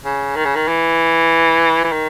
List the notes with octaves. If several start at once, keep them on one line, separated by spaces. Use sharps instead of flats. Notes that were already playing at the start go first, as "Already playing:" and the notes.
C#3
D#3
C#3
D#3
E3
E3
D#3